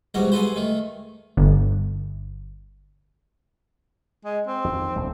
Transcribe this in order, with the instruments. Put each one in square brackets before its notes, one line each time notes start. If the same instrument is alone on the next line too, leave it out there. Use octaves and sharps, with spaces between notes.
[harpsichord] B1 G#2 E3 G3 F#4
G#4 A4 B4 C5
D#3 A3
[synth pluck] G1
[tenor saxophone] G#3
C4
[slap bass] F2 D#3
D#1 C2